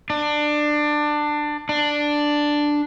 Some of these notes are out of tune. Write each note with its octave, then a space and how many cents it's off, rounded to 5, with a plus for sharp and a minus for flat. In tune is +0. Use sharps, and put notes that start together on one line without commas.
D4 +20
D4 +5